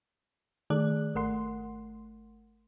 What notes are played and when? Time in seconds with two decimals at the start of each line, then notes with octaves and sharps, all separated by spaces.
0.70 D#3 A3 G#4 D5 F#6
1.15 G#1 A3 A#4 F#5 C6